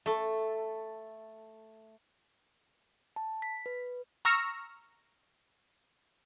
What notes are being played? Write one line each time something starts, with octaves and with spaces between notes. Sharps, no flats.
A3 A4
A5
B6
B4
A#5 C#6 E6 F6 A#6